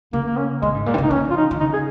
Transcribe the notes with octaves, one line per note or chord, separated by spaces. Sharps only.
C#3 A#3
A#3
C#4
A#2 G#3
G#2
A#2 A#3
D#3
C#3
D#4
F3 C#4
F4
D#4
D#3
C#3 D#4
G#4